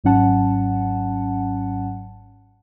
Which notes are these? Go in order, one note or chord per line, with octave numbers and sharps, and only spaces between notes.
G#1 G#2 F#3 C#4 F#5 A5